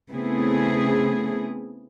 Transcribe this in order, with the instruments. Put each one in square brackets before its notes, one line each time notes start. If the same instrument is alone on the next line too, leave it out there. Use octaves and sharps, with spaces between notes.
[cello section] C#3 A3 B3 C4 E4 G#4